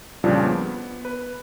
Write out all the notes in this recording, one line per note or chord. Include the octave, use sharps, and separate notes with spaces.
F2 A#2 C#3 F3 G3 D4
B3
B4